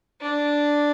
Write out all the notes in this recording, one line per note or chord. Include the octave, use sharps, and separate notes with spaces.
D4